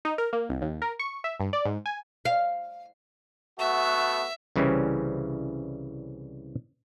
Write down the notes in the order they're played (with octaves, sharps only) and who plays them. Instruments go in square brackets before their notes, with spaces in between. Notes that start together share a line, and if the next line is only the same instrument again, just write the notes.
[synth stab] D#4
A#4
A#3
C2
D#2
A#4
C#6
E5
G2
D5
G#2
G#5
[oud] F5
[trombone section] A3 B3 F#4 [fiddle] E5
[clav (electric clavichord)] C2 C#3 E3 G3 C4 C#4